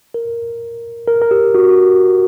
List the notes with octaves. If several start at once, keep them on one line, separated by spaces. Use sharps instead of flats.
A#4
A#4
A#4
G4
F#4
F#4